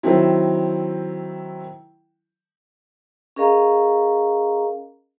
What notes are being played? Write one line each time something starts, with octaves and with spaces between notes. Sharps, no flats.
D#3 F#3 C4 E4
C#4 G#4 A#4 D#5 F5 A#5